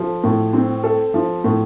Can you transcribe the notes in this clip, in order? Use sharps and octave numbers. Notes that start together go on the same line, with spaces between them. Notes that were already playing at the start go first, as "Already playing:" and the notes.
Already playing: F3 A4
A2
C4
A4
F3
A2